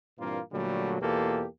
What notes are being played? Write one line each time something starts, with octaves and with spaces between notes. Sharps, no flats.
G2 A#2 E3 A#3 C4 F4
A#2 D3 F#3 G3 A3
E2 B2 A#3 F4 G4 A4